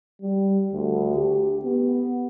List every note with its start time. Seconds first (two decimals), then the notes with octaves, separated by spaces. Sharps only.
0.22 G3
0.73 D2
1.16 G4
1.65 B3